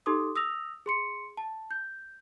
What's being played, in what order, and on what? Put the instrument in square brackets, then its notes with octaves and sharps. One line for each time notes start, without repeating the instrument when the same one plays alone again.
[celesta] D#4 G4 A4 C6 D6 D#6
D#6 E6 A#6 F7
G#4 C6 C#7
A5
G6